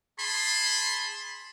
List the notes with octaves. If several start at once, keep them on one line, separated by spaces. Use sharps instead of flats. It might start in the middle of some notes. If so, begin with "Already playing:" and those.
G#4 A5 B5 C6